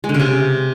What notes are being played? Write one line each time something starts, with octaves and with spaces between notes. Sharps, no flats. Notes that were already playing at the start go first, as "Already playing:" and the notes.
G#3
D3
C#3
C3